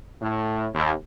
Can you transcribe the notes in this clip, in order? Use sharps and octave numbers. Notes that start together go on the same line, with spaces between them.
A2
D#2